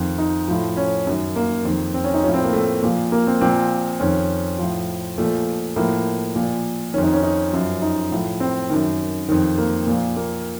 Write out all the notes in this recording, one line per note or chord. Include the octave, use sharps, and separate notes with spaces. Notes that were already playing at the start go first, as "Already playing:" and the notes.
Already playing: F2 D#3
D#4
A2 F3
C#4
F#2 D#3
A#3
F2 D#3
C4
C#4
D#4
A2 F3 C#4
C4
A#3
A3
A#2 F3
A#3
C4
A#2 F3 C4
F2 D#3 C#4
A2 F3
A#2 F3 A3
A2 F3 A#3
A#2 F3
F2 D#3 C#4
D#4
C#4
D#4
F#2 F3
D#4
A2 F3
C4
F#2 D#3
F2 D#3
A#3
A#2 F3
A#3